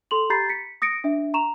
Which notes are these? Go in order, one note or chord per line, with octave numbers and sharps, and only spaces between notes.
A4 C6 F7 F#7
G4 A#5 B5 G6 A6 C7
B6 C#7
D#6 A#6 C#7 D7
D4 E5
A#5 C#6 E7 F7